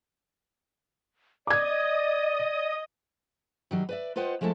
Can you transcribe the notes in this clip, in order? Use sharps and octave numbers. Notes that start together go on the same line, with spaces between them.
D5 D#5 D6 D#6 G#6
D#3 F#3 G3
B4 D5 E5
F4 B4 C5 D#5 F#5 G5
F3 G#3 A3 E4 A4 A5